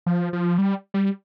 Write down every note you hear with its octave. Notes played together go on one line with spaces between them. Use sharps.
F3
F3
G3
G3